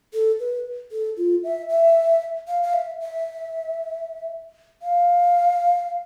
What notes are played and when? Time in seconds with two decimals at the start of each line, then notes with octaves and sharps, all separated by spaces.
0.14 A4
0.40 B4
0.92 A4
1.17 F4
1.44 E5
1.69 E5
2.48 F5
2.63 F5
2.73 E5
3.01 E5
4.82 F5